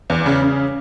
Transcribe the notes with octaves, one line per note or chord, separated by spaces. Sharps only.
E2
C#3
C#3